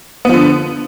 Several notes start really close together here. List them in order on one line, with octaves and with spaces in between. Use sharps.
B3 F3 D3